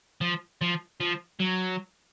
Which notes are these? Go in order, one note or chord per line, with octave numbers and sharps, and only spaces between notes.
F3
F3
F3
F#3